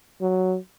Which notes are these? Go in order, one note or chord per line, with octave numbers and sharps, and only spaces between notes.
F#3